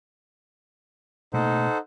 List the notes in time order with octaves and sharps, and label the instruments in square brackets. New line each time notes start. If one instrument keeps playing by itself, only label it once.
[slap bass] B2 A3 A#3 [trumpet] D#4 [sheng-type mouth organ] A4 C5 F#5